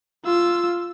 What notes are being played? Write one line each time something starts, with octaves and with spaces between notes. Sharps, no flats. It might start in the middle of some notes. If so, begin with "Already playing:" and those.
F4 E6